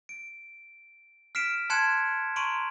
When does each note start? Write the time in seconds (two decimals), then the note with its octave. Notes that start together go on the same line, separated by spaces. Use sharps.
0.09 D7
1.35 F6 B6 C7 D7 E7
1.70 A5 C6 F#6 G#6 C#7 E7
2.36 A#5 C6 C#6 D7 D#7 F#7